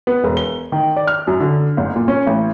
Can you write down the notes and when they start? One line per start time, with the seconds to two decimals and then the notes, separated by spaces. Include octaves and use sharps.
0.07 B3
0.24 E1
0.37 G7
0.72 D#3
0.96 D5
1.07 F6
1.27 F#2
1.40 D3
1.77 F#1
1.96 A#2
2.08 C#4
2.27 A1